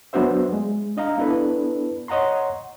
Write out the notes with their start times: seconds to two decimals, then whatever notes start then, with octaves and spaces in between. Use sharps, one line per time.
0.13 F#3 B3 D4 F#4 C5 E5
0.53 G#3
0.97 D4 D#5 F5 A#5
1.18 B3 D4 E4 A4 B4
2.08 C#5 D#5 F#5 A#5 C6